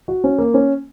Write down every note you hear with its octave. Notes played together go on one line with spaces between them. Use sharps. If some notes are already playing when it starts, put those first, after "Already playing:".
F#4
C#4
A#3
C#4